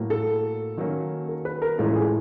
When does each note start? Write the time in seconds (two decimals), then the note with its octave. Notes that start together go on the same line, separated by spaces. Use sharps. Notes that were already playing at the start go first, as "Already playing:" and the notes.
Already playing: A2 F#3 A#3
0.10 A4
0.78 D#3 F#3 A#3 C#4
1.29 A#4
1.45 B4
1.62 A#4
1.78 A2 E3 G#3 C#4 F4 A4
1.96 G#4